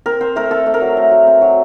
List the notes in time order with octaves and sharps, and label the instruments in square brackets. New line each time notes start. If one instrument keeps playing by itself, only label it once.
[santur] C4 A#4
C4 C5
A3 A#4
C4 A4
A3
A#4
F#3
A3
F#3
C4
F#3